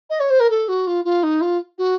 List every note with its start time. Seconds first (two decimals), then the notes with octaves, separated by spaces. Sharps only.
0.10 D#5
0.20 C#5
0.30 C5
0.40 A#4
0.50 A4
0.68 F#4
0.87 F4
1.05 F4
1.23 D#4
1.41 F4
1.78 F#4